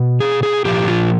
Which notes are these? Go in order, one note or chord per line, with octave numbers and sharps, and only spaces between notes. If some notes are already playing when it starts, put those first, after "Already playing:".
Already playing: B2
G#4
G#4
A#2 F3 G4
F4